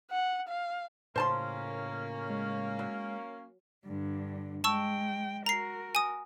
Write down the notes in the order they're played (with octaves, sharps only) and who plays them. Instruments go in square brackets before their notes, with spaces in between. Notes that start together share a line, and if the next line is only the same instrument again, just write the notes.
[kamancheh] F#5
F5
[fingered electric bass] A2 C#3 [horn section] A#3 C#4 [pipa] C5 A5 C6
[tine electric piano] G#3
[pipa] F#3
[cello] G2 D3
[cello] G#3 G5 [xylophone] A5 C#6 E6
[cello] F#4 A#4 [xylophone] A#5 C7
[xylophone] G#5 D#6